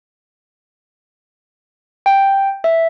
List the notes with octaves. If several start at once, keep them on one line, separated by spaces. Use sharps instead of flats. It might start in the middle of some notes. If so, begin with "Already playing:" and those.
G5
E5